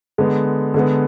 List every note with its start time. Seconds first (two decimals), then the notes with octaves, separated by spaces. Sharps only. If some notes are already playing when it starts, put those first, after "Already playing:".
0.18 D3 G#3 B3
0.74 D3 G#3 B3